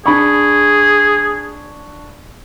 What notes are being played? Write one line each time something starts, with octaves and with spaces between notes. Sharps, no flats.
D4 G#4 B5 C#6